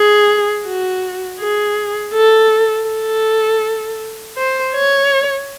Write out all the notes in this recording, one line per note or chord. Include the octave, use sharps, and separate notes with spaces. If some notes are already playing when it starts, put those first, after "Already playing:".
Already playing: G#4
F#4
G#4
A4
A4
C5
C#5